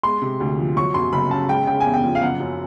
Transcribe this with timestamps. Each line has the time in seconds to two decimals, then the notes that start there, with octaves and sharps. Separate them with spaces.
0.03 G#3 C6
0.22 C3
0.40 D2
0.59 F3
0.76 F#3 C#6
0.94 F#2 C6
1.13 F#1 B5
1.31 C#3 A5
1.49 G#3 G5
1.67 C#3 G5
1.80 G#5
1.85 E2
1.94 G5
2.04 F3
2.15 F5
2.22 F#1 F#5
2.40 F#2